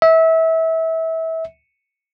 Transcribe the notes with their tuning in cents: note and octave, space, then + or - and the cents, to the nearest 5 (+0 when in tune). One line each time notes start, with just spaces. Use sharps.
E5 -25